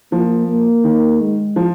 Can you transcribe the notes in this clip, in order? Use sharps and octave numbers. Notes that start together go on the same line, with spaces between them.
F3 A#3
A#3
D#3
G#3
F3